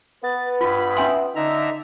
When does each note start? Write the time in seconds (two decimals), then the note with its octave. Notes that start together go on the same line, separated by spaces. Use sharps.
0.23 B3 B4 A6
0.61 G2 F4 B5
0.97 C#4 E5 G#5 C6
1.36 D3 D#4 E5 A#5